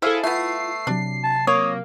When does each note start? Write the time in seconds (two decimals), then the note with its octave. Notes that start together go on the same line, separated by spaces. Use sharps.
0.02 E4 G#4 A4 C5 E5 F5
0.24 A3 B3 E4 F4 C7
0.87 C3 F#3 D4
1.24 A5
1.47 A#3 C#5 D#6